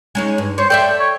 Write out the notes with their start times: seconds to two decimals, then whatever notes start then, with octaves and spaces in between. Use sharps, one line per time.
0.15 G#3 C#4 D#4
0.38 G2
0.58 C5 C#5
0.70 A4 D5 E5 G5
1.00 C#5